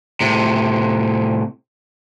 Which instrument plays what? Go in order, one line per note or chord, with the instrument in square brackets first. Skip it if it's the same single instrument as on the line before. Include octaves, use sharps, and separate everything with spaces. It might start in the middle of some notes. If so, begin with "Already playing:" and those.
[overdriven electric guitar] A2 C3